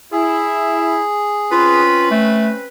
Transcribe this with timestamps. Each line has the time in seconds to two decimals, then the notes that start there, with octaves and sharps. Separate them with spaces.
0.12 E4 G#4
1.52 C4 C#4 F4 B4
2.11 A3